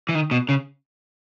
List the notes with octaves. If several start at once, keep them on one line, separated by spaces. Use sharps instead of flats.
E3
D#3
B2
C#3